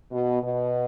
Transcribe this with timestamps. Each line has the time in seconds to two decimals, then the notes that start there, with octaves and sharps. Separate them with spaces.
0.11 B2
0.42 B2